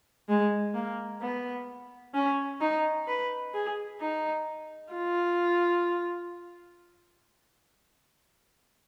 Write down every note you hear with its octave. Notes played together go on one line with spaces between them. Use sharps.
G#3
A#3
B3
C#4
D#4
B4
G#4
D#4
F4